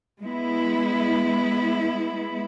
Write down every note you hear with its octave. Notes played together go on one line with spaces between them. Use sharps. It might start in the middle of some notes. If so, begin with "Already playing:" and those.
G#3 B3 E4